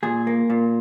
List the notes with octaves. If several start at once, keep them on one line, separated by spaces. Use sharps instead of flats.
A#2 G#4
A#3
A#2